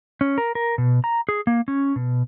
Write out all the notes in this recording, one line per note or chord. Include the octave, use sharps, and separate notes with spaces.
C#4
A#4
A#4
B2
A#5
G#4
A#3
C#4
B2